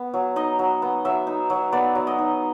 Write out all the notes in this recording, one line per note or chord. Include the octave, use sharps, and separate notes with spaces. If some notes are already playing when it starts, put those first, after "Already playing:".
Already playing: B3
F#3
D#4 D#5
F#3
B3
F#3 E5
D#4
F#3
B3 D5
F#3
D#5
D#4